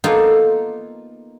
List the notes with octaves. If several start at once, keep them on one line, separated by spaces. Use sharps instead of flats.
A#3 B3 D#4 F4 A4